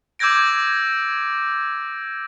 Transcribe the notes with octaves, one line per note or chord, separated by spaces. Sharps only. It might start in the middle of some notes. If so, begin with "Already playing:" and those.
D6 E6 G6 G#6 A#6 D7